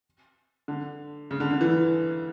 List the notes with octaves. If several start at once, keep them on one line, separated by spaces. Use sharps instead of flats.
D3
C#3
D3
D3
E3